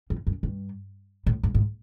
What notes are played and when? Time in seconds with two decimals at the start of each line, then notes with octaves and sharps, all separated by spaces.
0.10 F2
0.27 F#2
0.43 G2
1.27 A2
1.43 G#2
1.55 G#2